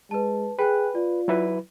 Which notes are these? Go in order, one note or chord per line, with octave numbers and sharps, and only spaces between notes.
G#3 B4 A5
G#4 B4 G5 G#5 F#6
F4 D5
F#3 E4 B4